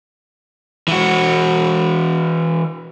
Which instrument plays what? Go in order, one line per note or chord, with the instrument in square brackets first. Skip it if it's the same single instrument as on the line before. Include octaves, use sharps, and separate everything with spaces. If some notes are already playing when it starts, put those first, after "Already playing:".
[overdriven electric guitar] E3 F#4